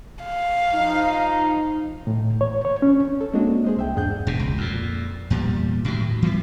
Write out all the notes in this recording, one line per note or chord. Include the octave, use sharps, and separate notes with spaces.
F5
F3 D#4
A2
C#5
C#5
C#4
A4
G#3 A#3 C4 D4 F#4 D#5
G#4 C5 D#5
C2 E5 G5
E2 G#2 D4 G#4 F#5 G6
E1 B2
C#2
F2 A#2
E2 A#2 G3
A2 D#3 F3 F#3
E3 G3 G#3 B3